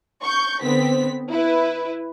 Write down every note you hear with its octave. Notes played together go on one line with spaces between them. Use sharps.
C#6 G6
D3 B3 C4 B6
E4 B4